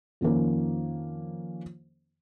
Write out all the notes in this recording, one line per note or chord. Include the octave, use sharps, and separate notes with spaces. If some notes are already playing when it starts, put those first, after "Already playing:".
F2 D#3 F3 A#3 C#4